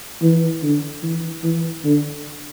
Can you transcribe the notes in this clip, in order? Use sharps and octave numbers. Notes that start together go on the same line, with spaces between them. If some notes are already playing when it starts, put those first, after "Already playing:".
E3
D3
E3
E3
D3